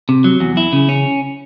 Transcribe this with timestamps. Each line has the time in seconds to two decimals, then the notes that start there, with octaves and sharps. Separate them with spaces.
0.09 C3
0.24 F#3
0.40 E2
0.57 E4
0.73 C#3
0.89 C#4